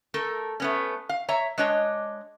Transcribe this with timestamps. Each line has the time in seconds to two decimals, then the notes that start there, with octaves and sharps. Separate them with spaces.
0.14 A3 A4 A#4
0.60 A3 B3 C#4
1.09 F5
1.29 C#5 E5 A#5
1.58 G#3 D4 C#5 D#5